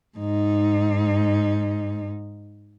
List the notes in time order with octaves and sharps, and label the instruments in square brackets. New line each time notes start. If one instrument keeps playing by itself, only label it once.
[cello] G#2 D#4